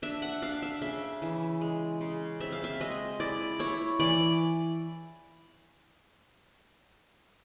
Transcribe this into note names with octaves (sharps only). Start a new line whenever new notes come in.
D4 E5
F#5
D4 F5
E5
C#3 E5
E3
G#3
C#3
C4 E5
F5
E5
G#3 D#5
E4 D5
E4 C#5
E3 D5